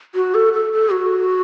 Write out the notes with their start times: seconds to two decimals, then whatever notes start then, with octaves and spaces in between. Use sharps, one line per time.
0.15 F#4
0.34 A4
0.53 A4
0.73 A4
0.92 F#4